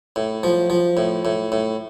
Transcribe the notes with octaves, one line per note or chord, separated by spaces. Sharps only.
A2
F3
F3
A2
A2
A2